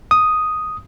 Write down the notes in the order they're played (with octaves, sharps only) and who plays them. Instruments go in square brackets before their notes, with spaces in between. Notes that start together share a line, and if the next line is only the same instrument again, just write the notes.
[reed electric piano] D#6